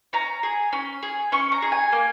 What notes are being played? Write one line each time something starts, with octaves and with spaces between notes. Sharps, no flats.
C#4 A#5
G#4
C#4
G#4
C#4 C#6
A#5
G#4
G#5
A#3